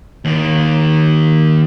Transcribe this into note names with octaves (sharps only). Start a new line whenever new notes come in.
D#2 D#3